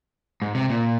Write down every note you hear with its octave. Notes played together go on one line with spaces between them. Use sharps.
G#2
C3
A#2